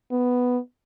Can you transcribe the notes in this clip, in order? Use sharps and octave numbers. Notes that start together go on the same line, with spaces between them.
B3